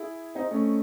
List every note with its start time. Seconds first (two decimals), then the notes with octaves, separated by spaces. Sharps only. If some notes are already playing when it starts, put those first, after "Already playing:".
Already playing: E4 G#4
0.35 C4 D#4
0.51 A3 C#4